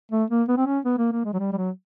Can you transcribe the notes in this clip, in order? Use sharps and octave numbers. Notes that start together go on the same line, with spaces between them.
A3
A#3
B3
C4
C#4
B3
A#3
A#3
G#3
F#3
G3
G3
F#3